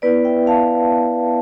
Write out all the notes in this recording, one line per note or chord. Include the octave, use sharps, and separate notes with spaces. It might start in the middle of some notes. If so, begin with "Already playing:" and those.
B3 E4 B4 D5
E5 G5
F5 A5